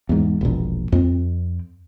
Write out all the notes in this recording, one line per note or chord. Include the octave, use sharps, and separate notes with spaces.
E2 G#2
E1 A#1
F2 C4